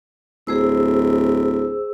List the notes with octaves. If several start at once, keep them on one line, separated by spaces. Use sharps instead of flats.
D1 G#4 C5 E6